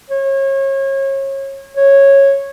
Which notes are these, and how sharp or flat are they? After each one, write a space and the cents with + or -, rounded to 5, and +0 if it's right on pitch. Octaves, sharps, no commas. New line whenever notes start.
C#5 -30
C#5 -10